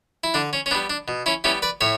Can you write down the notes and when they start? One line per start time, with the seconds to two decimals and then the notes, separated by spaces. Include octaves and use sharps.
0.24 E4
0.34 D3 D4
0.53 C#4
0.66 C#4
0.71 B3 D4
0.75 G3
0.90 D4
1.08 B2
1.26 C#4 E4
1.44 G3 B3 C#4 E4
1.62 B4 D5
1.81 A2 C#5 E5